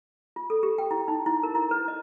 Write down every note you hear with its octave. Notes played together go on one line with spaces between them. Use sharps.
F4
A4
G4
G5
E4
D#4
E4
A#4
E4
B4
D#5